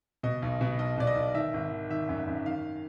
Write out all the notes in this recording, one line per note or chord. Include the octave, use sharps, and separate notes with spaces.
B2 D#5
B1
B2
B1 D#5
B2 D5
D#5
B1
D#3 E5
G#1
D#3
D#3 E5
F#2
F#2
D#3 F5